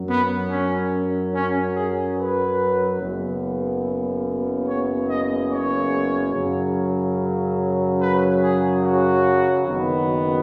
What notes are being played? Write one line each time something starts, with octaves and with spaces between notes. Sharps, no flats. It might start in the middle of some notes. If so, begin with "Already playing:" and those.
Already playing: F#2 F#3
B3
C#4
C#4
G#4
B4
F#1 F#2 C#3 B3
C#5
D#5
C#5
F#2 C#3 F#3
B4
G#4
F#4
F#1 F#2 D#3 F#3 B3